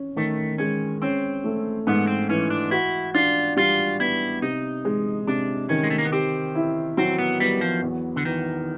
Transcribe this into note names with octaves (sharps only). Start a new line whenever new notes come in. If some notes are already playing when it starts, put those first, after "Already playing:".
Already playing: C#4
D#3 A3
G#3 C#4
C4 C#4
A3
G#2 B3
C4
E3 C#4
D4
E4 F#4
D4 F4
G3 F4
B3 E4
C3 D#4
G#3
C3 D4
D#3 C#4
G#3
A3
A#3
B3
C4 G4
E4
F#3 C4
B3
G3 B3
F3
E2
D3
D#3 E3